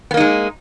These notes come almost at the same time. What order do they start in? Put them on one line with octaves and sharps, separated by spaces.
B3 A#3 D#4 G#3